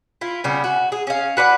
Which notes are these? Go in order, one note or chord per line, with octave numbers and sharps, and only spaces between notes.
E4 F4
C#3 G3 B3
F#4
G#4
C#4 F5
F#4 B4 D5 F#5